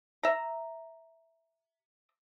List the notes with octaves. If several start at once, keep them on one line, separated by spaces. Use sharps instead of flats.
E5 A#5